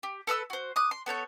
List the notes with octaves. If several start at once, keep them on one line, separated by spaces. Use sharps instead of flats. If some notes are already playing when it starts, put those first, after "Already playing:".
G4
A4 B4 B5 E6
F#4 C5
D6 D#6 F#6
C6
B3 A4 C#5 G6